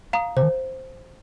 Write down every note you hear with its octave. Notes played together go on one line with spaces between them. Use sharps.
F5 A#5 D#6
C3 C5
D#3